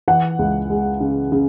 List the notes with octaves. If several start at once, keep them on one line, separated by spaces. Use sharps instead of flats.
E3 F#5
C#2
G#3
C#3
C#3